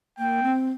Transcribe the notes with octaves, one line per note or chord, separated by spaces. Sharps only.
A#3 G5
C4